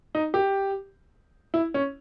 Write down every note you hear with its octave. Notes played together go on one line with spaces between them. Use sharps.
D#4
G4
E4
C#4